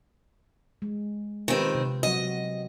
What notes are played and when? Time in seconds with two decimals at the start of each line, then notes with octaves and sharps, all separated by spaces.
0.82 G#3
1.48 D#3 C4 F4 G4 B4
1.75 C3
2.03 F#3 C4 F#4 D#5